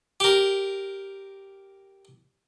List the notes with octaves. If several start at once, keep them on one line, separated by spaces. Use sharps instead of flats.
G4 A#4